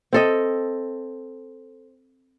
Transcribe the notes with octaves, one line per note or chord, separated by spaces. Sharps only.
C4 A4 D#5